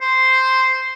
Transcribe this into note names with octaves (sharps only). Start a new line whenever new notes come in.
C5